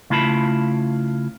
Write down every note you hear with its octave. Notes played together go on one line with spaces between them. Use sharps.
C#3 A3 E4 F4 A5 B5